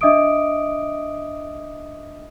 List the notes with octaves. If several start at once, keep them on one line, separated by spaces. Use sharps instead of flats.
D4 D#5 E5 D6 D#6 D7